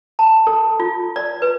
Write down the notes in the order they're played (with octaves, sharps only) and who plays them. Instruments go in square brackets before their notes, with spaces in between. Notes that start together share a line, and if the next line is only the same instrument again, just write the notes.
[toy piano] A5
A4
F4
D5
B4